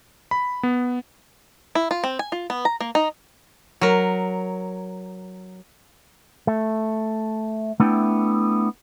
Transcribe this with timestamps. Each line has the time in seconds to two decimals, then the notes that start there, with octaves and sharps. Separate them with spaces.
0.31 B5
0.63 B3
1.75 E4
1.91 F4
2.04 C4
2.19 G#5
2.32 F4
2.50 B3
2.65 A#5
2.80 A#3
2.95 D#4
3.81 F#3 A#4
6.47 A3
7.80 A3 B3 D4 E4 G5